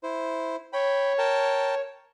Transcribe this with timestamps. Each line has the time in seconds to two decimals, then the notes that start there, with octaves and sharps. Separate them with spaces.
0.03 E4 C5
0.73 C#5 G5 B5
1.18 A#4 G5 A5